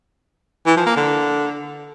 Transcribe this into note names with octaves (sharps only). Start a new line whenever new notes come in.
E3
F3
A#3
D3